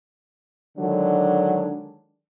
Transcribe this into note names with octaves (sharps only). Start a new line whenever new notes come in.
D3 D#3 F#3 G#3 D4